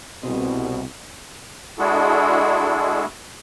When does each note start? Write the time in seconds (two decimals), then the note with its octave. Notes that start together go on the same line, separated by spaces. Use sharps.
0.23 C2 B2 C4 G#4 D#5
1.79 G#3 D4 E4 F#4 G#4 A4